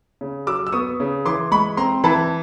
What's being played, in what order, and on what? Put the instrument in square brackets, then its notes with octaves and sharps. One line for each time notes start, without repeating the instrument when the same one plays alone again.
[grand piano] C#3
F#3 D6 E6
E6
B3 C#6 D#6
C#3
E3 C6 D6
G#3 B5 C#6
C4 A#5 C6
E3 A5 B5